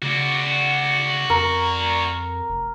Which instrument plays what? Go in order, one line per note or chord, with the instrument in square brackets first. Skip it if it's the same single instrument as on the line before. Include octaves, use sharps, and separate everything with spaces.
[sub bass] C#3 [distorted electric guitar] F#4 D5
[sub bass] F2 [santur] A#4
[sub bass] F1